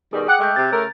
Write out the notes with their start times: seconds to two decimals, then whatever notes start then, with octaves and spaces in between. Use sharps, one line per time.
0.13 B2 D#3 G3 G#4
0.28 F#5 G5 D6
0.39 G#3 A3 D6 F#6 G6
0.56 C3 A6
0.72 C#3 A3 A#4